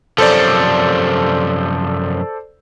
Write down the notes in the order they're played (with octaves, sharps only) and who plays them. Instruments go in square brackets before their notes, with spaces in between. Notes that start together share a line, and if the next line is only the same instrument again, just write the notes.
[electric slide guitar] F#2 C3 F3 [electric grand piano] A4 C5 D5